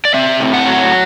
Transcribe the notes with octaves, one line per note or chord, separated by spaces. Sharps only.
D5
C4 E5
A2
F#5
F#3